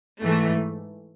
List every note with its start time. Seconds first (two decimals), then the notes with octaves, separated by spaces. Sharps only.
0.21 G#2 E3 A3